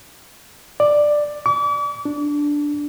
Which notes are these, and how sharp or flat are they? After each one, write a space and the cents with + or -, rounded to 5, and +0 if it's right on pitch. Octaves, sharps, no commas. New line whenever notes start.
D5 +10
D6 -40
D4 -5